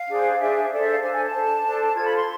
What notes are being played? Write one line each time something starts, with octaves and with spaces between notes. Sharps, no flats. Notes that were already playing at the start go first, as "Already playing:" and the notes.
Already playing: F5
D4 G#4 C5
D4 G#4 C5 E5
D4 A4 C5 D5
E5
F5
D4 A4 C5 G#5
G#5
A5
D4 A4 C5
D4 A4 C5
F4 A4 C5 G#6
B5
C6